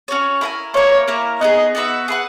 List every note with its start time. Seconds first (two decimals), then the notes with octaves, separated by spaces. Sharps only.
0.08 C#4 F#4 C#5
0.41 E4 A#4 E5 G#5
0.74 A#3 E4 A#4 C#5
1.08 A#3 E4 A#4 C#5
1.41 B3 D#4 G#4 D#5
1.75 B3 F#4 B4 E5
2.08 G#4 B4 F#5